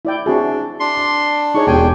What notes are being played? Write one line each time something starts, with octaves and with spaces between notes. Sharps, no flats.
E4 D5 G5
C4 D4 F#4 G#4 E5 A5
D4 C6
A5
D#4 G#4 C#5 C#6
E1 G4 G#4 G5 G#5